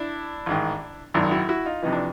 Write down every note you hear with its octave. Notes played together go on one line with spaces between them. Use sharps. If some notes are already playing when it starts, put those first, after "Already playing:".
Already playing: D4 E4
A1 G#2 D#3
G#1 F#2 D#3 D4 E4
E4 F#4
E4 F#4
D#4 F4
F2 C3 E3 D#4
D4